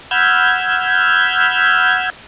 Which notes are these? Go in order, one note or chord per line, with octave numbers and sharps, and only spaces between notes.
F#5 B5 E6 F6 G6 G#6